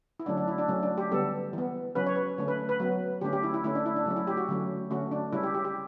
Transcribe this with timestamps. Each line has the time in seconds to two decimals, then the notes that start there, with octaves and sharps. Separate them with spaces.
0.20 E4
0.26 D3 F#3 A3 C#4 D4
0.37 D4
0.48 E4
0.58 D4
0.68 C#3 F#3 A3 C#4
0.83 D4
0.98 G4
1.11 D3 G3 B3 A4
1.53 E3 B3
1.95 C#3 F#3 C#4 B4
2.07 C#5
2.16 B4
2.38 D3 A3 C#4
2.48 B4
2.69 B4
2.80 F#3 B3
3.21 D3 A3 C#4 G4
3.33 G4
3.43 E4
3.54 E4
3.64 D3 A3 C#4 E4
3.75 D4
3.86 E4
3.96 D4
4.06 C#3 F#3 A3 C#4
4.16 E4
4.27 G4
4.37 F#4
4.49 D3 F#3 A3 C#4
4.91 D3 A3 C#4 F#4
5.11 D4
5.32 C#3 G3 C#4 E4
5.43 G4
5.54 G4
5.65 G4